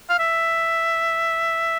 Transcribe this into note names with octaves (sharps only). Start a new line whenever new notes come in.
F5
E5